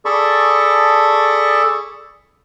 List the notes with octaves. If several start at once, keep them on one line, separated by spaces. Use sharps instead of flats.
G#4 A4 D5 A5 B5 C#6